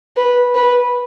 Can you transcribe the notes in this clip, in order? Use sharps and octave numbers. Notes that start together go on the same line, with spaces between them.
B4
B4